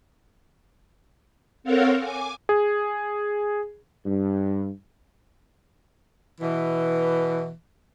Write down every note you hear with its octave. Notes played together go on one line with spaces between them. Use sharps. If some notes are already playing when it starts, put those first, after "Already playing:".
C4 A4 A#4 C#5 F5 F#5
G#5 D6
G#4
G2
B2 E3